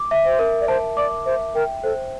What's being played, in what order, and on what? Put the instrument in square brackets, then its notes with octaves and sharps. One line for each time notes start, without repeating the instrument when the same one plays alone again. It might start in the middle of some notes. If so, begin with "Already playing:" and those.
Already playing: [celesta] D6
E5
[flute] C5
[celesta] A#4
[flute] D5
[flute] C5 [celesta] A5
[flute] D5 [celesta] D6
[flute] C5 [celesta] E5
[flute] A#4 [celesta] G5
[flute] A4 [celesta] C5